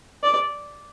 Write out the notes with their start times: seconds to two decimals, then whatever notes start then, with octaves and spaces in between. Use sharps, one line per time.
0.23 D5